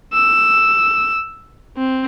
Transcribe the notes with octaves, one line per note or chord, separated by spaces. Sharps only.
E6
C4